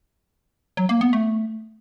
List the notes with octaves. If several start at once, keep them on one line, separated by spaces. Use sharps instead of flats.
F#3
A#3
B3
A3